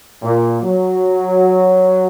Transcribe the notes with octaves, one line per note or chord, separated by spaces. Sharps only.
A#2
F#3